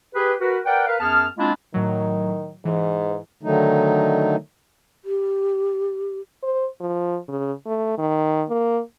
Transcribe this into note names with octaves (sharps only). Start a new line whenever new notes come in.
G4 G#4 B4
F#4 A#4 B4
A#4 B4 D5 F#5 G5
A#4 B4 F5
F#2 B3 G#4 A5 F6
G#3 A#3 C4 D4 E4 F4
A2 D#3 F#3
G#2 E3
D3 D#3 F#3 A3 D#4
G4
C5
F3
C#3
A3
D#3
A#3